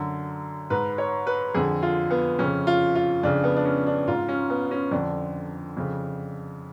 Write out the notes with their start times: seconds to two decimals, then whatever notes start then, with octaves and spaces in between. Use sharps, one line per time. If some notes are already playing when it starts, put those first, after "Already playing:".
Already playing: F#2 D3
0.70 G#2 B4
0.98 C#5
1.27 B4
1.54 F2 D3 G#4
1.82 F4
2.11 B3
2.39 F2 C#3 C#4
2.67 F4
2.95 F4
3.23 F2 C#3 D4
3.44 B3
3.57 D4
3.65 C#4
3.87 D4
4.07 G#2 F4
4.29 C#4
4.50 B3
4.71 C#4
4.91 F2 D3 D4
5.77 F2 C#3